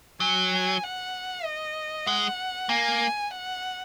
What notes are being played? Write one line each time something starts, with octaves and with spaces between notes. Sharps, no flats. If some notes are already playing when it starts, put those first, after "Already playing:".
F#3 G#5
G#5
F#5
D#5
G#3 F#5
A#3 G#5
F#5